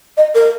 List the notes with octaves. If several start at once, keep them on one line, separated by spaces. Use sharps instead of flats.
D#5
A#4